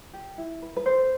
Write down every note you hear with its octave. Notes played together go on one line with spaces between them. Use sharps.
G4
E4
B4
B4
A4 C5